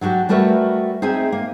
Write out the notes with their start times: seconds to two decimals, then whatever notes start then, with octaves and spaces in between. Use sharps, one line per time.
0.01 F#3 D4 F#4 G4
0.29 G3 A3 F#4 A#4 B4 E5
1.02 C4 D#4 G#4 E5 G#5
1.32 A#3